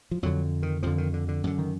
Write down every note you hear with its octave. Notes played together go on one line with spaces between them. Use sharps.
F3
F2 D3 F#3
D#3
F2 D3 F3
D#3
D3
D3
F#2 D3
D#3